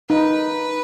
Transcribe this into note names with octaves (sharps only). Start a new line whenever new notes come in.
D#4 B4